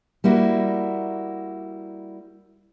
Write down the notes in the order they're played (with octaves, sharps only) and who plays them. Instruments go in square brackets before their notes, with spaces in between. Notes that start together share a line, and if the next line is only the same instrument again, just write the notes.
[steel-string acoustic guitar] G3 A#3 E4 F#4